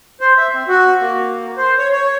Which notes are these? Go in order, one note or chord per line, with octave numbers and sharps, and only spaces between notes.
C5
E5
C4
F#4
A#3
C5
C#5
C#5